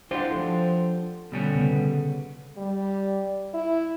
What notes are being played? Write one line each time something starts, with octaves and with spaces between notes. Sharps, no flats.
D4 E4 F4 G4 C5 F#5
F3 A4
B2 D3 G3 C#4
C#3 B3
G3
E4